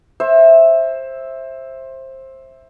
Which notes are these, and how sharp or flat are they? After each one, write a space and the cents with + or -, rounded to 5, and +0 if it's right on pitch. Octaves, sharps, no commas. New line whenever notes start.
C5 +20 E5 +0